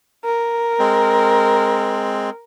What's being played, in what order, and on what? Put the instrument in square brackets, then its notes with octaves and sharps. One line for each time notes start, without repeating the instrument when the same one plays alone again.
[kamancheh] A#4
[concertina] G#3 C4